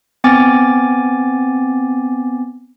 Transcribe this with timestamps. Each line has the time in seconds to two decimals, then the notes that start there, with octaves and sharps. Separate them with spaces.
0.24 B3 C4 G#5 D6 A6